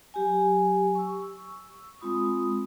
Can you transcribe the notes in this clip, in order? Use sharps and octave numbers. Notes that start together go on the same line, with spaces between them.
F#3 G4 G#5
C#6 E6
G#3 C4 F4 B5 D#6